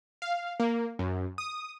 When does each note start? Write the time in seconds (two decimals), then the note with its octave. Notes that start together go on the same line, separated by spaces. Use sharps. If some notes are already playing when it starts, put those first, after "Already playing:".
0.22 F5
0.60 A#3
0.99 F#2
1.38 D#6